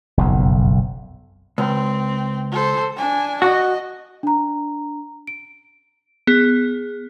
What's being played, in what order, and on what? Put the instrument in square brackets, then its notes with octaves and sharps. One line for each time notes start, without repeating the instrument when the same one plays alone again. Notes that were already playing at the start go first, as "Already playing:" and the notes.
[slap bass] F#1 B1 F2
[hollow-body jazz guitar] C#2 [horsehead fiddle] C4
[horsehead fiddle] A4 C5
D4 G#5
[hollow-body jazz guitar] F#4 [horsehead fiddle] D#5
[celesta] D4 A#5
D7
[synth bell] B3 [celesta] G#4